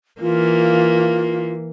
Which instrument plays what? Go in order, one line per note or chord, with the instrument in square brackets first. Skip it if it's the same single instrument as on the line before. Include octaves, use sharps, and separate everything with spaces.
[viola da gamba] E3 A#3 [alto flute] F4